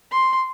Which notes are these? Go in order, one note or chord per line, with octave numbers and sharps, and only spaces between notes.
C6